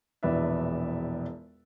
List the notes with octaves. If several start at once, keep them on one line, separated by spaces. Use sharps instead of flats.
E1 A#1 E2 B4 D5 E5